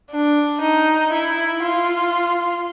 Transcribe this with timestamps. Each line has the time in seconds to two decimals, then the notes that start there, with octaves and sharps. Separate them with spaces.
0.11 D4
0.61 D#4
1.12 E4
1.62 F4